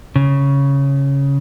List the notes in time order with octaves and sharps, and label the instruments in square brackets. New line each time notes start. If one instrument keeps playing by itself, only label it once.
[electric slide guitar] C#3